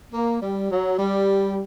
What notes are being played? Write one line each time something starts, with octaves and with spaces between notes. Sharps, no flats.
A#3
G3
F#3
G3